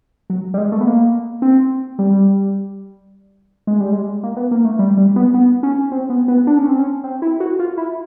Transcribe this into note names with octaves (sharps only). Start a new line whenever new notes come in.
F#3
G3
G#3
A3
B3
A#3
C4
G3
G#3
G3
G#3
A#3
B3
A#3
A3
G3
G3
B3
B3
C#4
C4
B3
B3
D4
C#4
C4
C#4
C4
E4
F#4
F4
E4